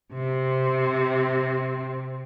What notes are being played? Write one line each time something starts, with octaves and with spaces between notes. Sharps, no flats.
C3 C4